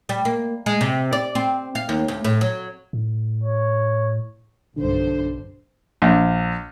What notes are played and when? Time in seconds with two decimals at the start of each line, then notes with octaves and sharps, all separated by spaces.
0.09 G3
0.25 A#3
0.66 G#3
0.81 C3
1.13 D5
1.35 C4
1.75 F5
1.89 D#2
2.08 D2
2.24 A2
2.41 F#3
2.93 A2
3.44 C#5
4.77 B1 G2 D3 C5
6.02 A#1